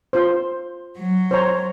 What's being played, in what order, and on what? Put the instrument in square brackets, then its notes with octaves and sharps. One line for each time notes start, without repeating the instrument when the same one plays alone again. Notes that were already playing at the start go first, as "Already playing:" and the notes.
[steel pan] F4 C5
[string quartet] F#3
[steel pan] C5 C#5 A#5